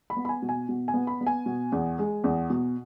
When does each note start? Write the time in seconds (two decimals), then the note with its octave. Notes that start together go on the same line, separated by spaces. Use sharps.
0.10 B5
0.16 B3
0.25 B5
0.29 G#5
0.42 B2
0.49 G#5
0.69 B2
0.88 G#5
0.94 B3
1.07 B5
1.21 B3
1.26 G#5
1.46 B2
1.72 E2
1.99 G#3
2.24 E2
2.50 B2